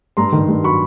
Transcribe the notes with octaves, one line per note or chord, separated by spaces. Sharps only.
G2 A#5 C6
D#3
G2
F#3 B5 C#6